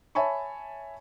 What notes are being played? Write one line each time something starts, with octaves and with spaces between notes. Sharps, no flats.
C#5 E5 G#5 A5 B5 C#6